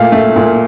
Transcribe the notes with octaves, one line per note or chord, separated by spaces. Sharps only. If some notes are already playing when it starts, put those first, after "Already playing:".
Already playing: A#2 A3 F5
A3
A#2